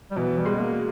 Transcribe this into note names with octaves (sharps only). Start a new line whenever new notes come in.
G3
B2 E3
G3
G#3
A#3